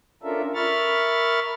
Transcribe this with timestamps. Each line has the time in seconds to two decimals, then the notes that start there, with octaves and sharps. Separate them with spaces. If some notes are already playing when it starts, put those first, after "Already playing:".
0.23 C#4 D4 F4 A4 A#4 E5
0.55 A#4 E5 B5 C#6 F6 A6